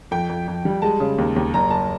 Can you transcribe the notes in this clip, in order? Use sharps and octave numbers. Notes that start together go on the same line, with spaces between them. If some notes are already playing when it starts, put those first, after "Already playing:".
F2 G5
F2
F2
G3
G#3 A5
C#3
D#2
D#2
F#1 A#5
F#1 A5